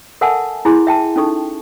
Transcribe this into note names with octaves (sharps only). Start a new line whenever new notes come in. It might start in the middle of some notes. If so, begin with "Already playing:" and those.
A4 A#4 E5 F#5 G#5 A5
E4 G#4 G#5 C6
E5 G5 A5
C#4 D#4 A4 C#6